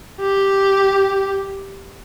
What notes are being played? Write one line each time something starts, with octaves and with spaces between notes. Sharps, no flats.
G4